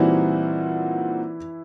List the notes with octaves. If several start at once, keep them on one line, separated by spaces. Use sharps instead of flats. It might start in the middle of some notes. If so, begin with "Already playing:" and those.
Already playing: A#2 E3 G3 C4 D#4 E4 F#4